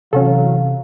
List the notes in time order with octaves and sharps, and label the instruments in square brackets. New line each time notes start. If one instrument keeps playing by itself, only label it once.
[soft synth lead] C3 [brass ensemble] E3 F#3 F5 [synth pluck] C#4 F#4 A4